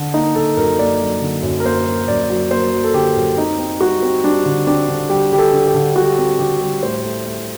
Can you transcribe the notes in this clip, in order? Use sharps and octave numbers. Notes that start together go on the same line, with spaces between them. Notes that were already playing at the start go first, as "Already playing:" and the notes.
Already playing: D3
A#3 D#4
D3 A4
F#2 A#4
A#3 D5
F#3
D3
F#2
A#4
A#3 C5
F#3
F#2 D5
F#3
A#3 C5
F#3
A4
D3 G4
F#2
C4 D#4
C4
G3 F#4
C4
G3 D4
D3
C4 D4
D3
G3 G4
D3 G4
A4
D3
G4
D3
G3 F#4
C4
D3 G4
G3
A2 C5
A3
A3